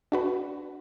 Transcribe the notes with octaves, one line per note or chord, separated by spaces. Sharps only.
D4 F#4 B4